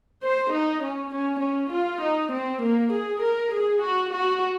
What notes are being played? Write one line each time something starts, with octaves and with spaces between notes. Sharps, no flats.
C5
D#4
C#4
C#4
C#4
F4
D#4
C4
A#3
G#4
A#4
G#4
F#4
F#4